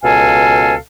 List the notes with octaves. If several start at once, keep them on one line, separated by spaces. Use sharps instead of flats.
C#2 B2 A4 F5 G#5